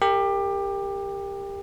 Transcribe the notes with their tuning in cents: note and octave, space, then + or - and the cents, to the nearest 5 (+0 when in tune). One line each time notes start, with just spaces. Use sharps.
G4 +20 A#4 -20